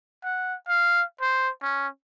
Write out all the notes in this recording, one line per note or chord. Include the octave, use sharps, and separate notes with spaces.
F#5
F5
C5
C#4